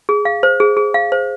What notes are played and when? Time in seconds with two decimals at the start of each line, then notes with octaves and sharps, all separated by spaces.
0.09 G#4
0.25 F5
0.43 C5
0.60 G#4
0.77 G#4
0.94 F5
1.12 C5